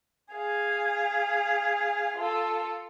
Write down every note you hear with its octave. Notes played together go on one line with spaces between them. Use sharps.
G#4 F5
F4 A4